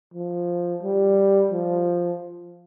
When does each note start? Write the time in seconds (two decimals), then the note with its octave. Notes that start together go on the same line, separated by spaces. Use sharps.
0.14 F3
0.83 G3
1.51 F3